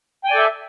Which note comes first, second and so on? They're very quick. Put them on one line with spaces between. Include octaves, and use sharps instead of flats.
G5 G#5 D5 A4 E5